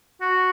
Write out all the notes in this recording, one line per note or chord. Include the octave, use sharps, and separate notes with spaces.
F#4